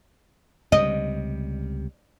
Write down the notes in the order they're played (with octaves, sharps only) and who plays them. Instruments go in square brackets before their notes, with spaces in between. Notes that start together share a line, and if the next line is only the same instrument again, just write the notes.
[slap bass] C#2 C3 G3 [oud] D#5